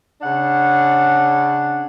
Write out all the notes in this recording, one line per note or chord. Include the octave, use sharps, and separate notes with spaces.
C#3 D4 F#5